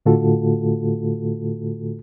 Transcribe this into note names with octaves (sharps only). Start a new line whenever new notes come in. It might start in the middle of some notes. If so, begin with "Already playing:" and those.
A2 D3 A3 F4 F#4 A4